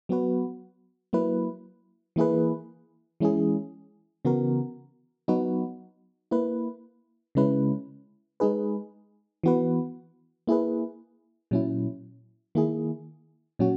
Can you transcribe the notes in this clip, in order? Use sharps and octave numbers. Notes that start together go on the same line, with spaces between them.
F#3 B3 F#4 B4
F#3 A#3 E4 B4
E3 A#3 E4 G#4 B4
E3 G#3 C#4 E4 G#4
C#3 E3 B3 F#4 A#4
F#3 B3 D#4 F#4 B4
A#3 E4 B4
C#3 G#3 C#4 E4 B4
G#3 D#4 G#4 B4
E3 B3 F#4 B4
A#3 E4 G#4 B4
A#2 F#3 C#4 E4
D#3 A#3 E4 G#4
A#2 F#3 C#4 F#4